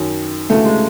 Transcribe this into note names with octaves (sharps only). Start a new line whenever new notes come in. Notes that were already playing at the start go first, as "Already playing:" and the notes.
Already playing: F#2 D#3
D2 C#3 E3 A3
G#3